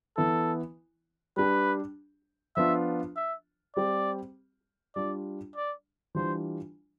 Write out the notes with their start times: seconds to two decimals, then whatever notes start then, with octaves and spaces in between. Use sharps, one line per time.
0.17 E3 B3 E4 A4
1.37 G3 D4 G4 B4
2.56 F3 B3 D4 F4 E5
3.16 E5
3.76 G3 C4 G4 D5
4.95 G3 D4 F4 D5
5.56 D5
6.15 E3 G3 D4 F4 C5